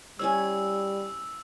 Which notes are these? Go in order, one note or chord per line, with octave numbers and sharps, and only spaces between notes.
G3 C#4 E4 C#5 E6